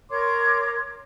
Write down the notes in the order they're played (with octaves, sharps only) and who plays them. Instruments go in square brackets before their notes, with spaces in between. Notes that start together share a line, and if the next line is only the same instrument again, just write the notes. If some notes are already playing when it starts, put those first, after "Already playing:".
[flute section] A#4 C#5 C6 D6